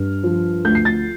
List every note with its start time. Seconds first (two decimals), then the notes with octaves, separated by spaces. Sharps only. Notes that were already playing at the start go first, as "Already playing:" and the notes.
Already playing: G2 F6
0.23 F3
0.65 D2 G6
0.75 C7
0.85 A6